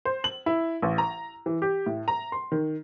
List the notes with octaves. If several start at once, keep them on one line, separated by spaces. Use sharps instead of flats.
C5
F#7
E4
A1
A#5
E3
G4
A2
A#5
C6
D#3